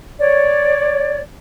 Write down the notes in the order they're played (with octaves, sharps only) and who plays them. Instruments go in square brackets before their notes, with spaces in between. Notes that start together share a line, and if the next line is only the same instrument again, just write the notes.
[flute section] C#5 D5